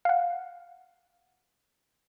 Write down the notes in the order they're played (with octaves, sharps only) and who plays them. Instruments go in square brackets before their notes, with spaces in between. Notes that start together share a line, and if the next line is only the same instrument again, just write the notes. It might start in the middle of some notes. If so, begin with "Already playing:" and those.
[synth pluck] F5 F#5